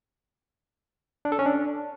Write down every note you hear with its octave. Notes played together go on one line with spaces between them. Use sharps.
D4
A4
C#4
D4